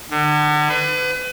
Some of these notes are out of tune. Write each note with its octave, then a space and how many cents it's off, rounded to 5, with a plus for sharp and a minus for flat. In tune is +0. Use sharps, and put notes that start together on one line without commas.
D3 +40
B4 +35